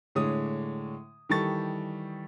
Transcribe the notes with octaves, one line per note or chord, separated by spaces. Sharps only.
A2 D3 G#3 C#5 D#6
D#3 E3 G3 A4 C#6 A6